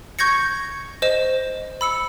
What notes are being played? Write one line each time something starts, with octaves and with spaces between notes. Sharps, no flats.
C#6 G6 G#6 A#6 C#7
C5 D#5 E7
B5 E6 C#7